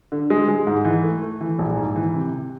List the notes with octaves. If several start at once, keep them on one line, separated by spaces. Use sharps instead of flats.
D3
G#3
G#3
G#2
E3
A3
A3
E3
A#1
G#2
E3
C3
C3